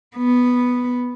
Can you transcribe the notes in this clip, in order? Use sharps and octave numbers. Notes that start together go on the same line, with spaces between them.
B3